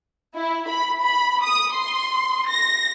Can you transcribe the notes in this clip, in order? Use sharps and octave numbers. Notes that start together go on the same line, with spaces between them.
E4
B5
B5
D#6
C6
A#6